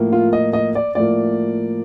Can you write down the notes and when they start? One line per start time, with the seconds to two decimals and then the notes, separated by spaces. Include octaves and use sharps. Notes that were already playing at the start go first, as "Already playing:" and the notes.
Already playing: A2 F3 A#3
0.12 F4
0.33 D#5
0.53 D#5
0.75 D5
0.95 A2 F3 A#3 D5